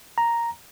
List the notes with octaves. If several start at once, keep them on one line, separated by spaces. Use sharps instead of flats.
A#5